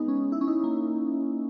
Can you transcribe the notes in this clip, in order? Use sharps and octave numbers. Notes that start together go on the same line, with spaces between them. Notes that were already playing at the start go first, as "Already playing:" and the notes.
Already playing: G#3 B3 D#4
C#4
E4
C#4
D#4
A#3